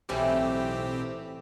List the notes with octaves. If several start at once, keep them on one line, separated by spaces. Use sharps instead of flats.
B1 A2 E3 G3 C4 G4